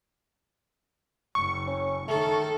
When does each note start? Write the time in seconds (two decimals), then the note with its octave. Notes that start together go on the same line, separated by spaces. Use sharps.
1.35 F#1 C#6
1.68 C#4
2.08 D#3 A3 A4